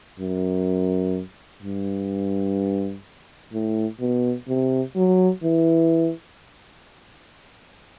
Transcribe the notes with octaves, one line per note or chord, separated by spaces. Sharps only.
F#2
G2
A2
B2
C3
F#3
E3